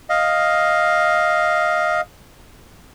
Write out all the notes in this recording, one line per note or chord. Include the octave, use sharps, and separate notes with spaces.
D#5 F5